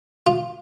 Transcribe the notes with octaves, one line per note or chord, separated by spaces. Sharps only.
F4